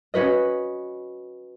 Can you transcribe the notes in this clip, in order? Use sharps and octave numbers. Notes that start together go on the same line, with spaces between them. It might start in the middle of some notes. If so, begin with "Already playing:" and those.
C#4 F#4 B4 D#5